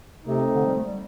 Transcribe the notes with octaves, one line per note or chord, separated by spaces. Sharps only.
C3 A3 C4 D#4
D3
G3
A3
G3